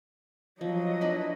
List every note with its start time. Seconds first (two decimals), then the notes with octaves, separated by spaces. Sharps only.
0.61 F3 F#3 D#5
1.01 D4 E4 B4